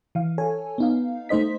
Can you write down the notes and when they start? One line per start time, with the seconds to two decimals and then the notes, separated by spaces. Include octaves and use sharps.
0.15 E3 F5
0.38 A4 C#5 G#5
0.78 B3 D#4 F5
1.29 A3 D#4 C5 D#5 B6